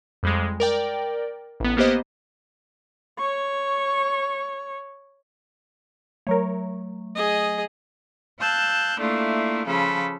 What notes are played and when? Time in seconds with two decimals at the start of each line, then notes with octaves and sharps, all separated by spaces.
0.23 F2 G3 G#3
0.60 A#4 D5 G5
1.60 A1 B3
1.77 A#3 B3 G4 C5 D#5
3.18 C#5 C#6
6.27 F#3 A3 A#4 C#5
7.16 G#4 D#5
8.40 F5 A5 E6 F#6 G6
9.00 A3 A#3 D4 E4 F4
9.66 C#3 F3 F4 A4 B5